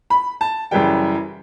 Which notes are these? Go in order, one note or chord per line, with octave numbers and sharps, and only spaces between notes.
B5
A5
F#2 C#3 E3 G3 G5